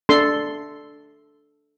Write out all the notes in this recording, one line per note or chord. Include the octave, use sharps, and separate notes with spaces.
D4 A4 C6